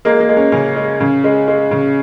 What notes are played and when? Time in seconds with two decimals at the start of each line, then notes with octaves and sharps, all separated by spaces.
0.05 G#3 A#3
0.20 A#3
0.29 G#3
0.37 C#4
0.52 C#3 C#4
0.76 G#3
1.00 C#3
1.24 G#3
1.48 G#3
1.71 C#3